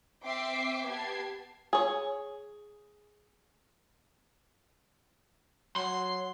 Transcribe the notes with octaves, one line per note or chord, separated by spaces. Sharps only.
C4 E5 G5 D6 C7
B3 G4 A5 G#6 C7
G#4 C#5
F#3 C6